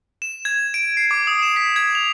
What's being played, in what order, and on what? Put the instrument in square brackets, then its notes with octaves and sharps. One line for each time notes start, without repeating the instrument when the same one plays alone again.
[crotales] E7
G#6
D7
C7
D6
D#6
E7
B6
G#6
F7